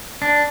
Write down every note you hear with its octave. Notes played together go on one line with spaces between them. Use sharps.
D4